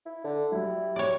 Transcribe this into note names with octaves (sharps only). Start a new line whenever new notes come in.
E4
D3
F#3 G3 E4
C#5 D5